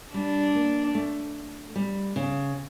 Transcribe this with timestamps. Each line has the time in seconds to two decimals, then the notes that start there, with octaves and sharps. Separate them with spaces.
0.14 G3 D4
0.55 A#3
0.95 A3
1.75 G3
2.16 C#3